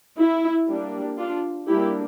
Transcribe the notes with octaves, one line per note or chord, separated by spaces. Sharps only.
E4
G3 A#3 D4
D4 F4
G3 A#3 D4 E4 G4